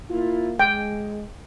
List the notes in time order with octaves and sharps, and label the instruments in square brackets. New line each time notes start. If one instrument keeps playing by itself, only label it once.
[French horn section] A#3 E4 F4
[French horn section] G#3 [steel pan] G5